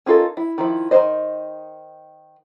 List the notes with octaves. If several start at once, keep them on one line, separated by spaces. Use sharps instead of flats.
C#4 D#4 F4 A4 A#4
E4
D#3 F3 E4
D#3 C#4 D#4 C5 D#5